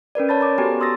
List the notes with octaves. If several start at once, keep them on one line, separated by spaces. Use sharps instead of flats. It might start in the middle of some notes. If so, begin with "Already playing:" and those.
C#4 A#4 B4 D5
C#5 A5 B5 A6
A#5 D6
B3 F#4 G4 A4 G#5 A#5
C6 D#6 E6 A6 A#6